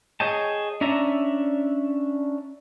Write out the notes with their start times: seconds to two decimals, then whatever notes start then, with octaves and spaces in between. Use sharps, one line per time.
0.20 G#4 C#5 D#5 G5 A5
0.81 C#4 D4 D5 E5 A#5